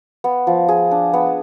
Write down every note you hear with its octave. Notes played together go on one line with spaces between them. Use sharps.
B3
F3
G#4
D4
B3